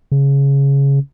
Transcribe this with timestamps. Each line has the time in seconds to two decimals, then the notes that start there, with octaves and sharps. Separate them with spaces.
0.12 C#3